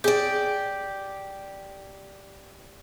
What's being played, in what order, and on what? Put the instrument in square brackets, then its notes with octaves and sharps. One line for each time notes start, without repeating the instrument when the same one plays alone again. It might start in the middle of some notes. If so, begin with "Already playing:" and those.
[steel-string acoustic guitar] G4 D5 [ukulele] G#4